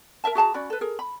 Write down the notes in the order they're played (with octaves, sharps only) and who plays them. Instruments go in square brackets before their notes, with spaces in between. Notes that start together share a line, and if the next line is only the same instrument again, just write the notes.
[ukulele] A#4 D#5 E5 A5
F#4 G#4 A5 A#5
C#4 F#4 D5 B5
A4 B4
G#4 A#4
B5